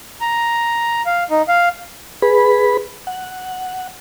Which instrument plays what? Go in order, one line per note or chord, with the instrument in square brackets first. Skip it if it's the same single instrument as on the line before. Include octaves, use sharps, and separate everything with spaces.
[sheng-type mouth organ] A#5
F5
D#4
F5
[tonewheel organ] G#4 B4 B5
F#5